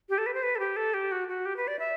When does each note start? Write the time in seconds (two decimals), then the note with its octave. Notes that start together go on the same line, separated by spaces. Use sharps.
0.09 G4
0.18 A4
0.26 B4
0.34 C5
0.43 B4
0.55 A4
0.59 G4
0.76 A4
0.94 G4
1.12 F#4
1.28 F#4
1.46 G4
1.57 B4
1.68 D5
1.79 E5